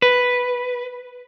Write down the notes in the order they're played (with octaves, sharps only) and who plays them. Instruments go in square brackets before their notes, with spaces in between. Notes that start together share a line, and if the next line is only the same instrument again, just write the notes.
[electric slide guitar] B4